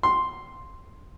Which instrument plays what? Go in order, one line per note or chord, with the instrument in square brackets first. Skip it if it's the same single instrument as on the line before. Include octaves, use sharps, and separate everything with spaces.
[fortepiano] C6